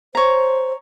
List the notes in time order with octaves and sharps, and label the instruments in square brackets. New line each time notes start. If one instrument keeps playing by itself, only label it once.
[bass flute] C5 [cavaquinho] C#5 A#5